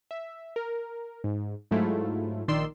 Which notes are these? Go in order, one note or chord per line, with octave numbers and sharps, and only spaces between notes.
E5
A#4
G#2
G#2 F#3 A3 E4 F4
A#1 D#3 D5 C6 E6